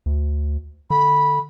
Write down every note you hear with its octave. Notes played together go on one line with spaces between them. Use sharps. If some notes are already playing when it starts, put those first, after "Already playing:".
D2
D3 B5